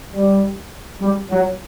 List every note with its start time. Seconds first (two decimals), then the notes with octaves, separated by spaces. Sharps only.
0.13 G3
1.01 G3
1.30 F#3